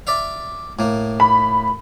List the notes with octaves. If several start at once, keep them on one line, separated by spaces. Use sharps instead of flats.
D5 E5 F5
A2 A#3
B5